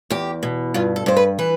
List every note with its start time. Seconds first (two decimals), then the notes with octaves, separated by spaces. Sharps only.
0.10 E2 G4
0.43 B2
0.74 G2 F4
0.96 A4
1.06 G2 C5
1.17 B4
1.39 E3 B4